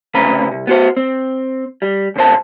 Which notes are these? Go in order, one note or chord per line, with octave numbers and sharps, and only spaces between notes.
D2 C#3 C4 B4 A#5
C2
B3 F#4 C5
C4
G3
D2 G#2 C5 A5